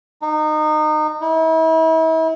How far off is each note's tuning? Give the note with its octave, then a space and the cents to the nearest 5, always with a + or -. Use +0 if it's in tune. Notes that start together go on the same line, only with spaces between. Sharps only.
D#4 -25
E4 -40